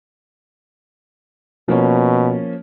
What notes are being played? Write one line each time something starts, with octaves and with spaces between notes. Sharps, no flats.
B2 F3 A#3 C#4